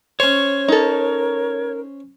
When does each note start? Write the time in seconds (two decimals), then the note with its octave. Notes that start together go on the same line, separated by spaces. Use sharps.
0.20 C#4 C5 C#5
0.68 D#4 A4 A#4